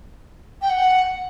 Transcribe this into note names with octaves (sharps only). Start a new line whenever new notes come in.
G5
F#5